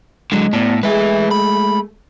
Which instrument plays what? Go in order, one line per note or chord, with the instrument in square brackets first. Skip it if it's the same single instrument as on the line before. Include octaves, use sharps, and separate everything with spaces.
[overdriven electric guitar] D3 F#3 [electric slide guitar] G#3
[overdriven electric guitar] A2 [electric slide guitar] B3 D5 A5
[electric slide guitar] G#3 A3 G#4 [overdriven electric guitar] B4 E5
[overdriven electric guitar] B5